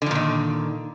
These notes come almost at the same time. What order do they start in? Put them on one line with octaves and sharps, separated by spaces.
D3 F3 A#2 D#3